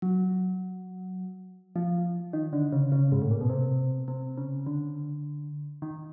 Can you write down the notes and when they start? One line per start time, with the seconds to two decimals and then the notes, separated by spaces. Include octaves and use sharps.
0.02 F#3
1.76 F3
2.33 D#3
2.53 D3
2.72 C#3
2.92 C#3
3.12 G#2
3.22 A2
3.31 A#2
3.41 B2
3.49 C3
4.08 C3
4.38 C#3
4.66 D3
5.82 D#3